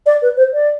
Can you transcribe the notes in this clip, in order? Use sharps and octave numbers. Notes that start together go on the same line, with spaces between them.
D5
B4
C5
D5